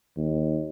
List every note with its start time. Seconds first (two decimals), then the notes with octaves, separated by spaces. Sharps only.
0.17 D#2